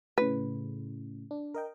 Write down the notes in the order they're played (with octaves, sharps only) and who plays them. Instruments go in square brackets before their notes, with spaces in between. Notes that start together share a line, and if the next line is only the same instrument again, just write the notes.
[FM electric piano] A2 C#3 [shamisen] B4
[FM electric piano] D4
A#4 D#5 G5